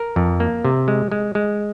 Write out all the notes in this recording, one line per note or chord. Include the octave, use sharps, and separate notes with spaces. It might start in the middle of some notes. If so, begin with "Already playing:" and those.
Already playing: A#4
F2
A#3
C3
G#3
G#3
G#3